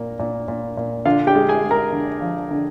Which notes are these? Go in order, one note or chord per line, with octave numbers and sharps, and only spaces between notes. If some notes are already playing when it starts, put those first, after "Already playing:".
Already playing: A#2 A#3
A#2
A#2
A#2
D3 F4 F5
G4 G5
G#3
G#4 G#5
G#3
A#4 A#5
D3
F3
D3